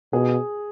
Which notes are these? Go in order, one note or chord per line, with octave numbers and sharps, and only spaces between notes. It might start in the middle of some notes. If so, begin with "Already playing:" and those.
B2 G#4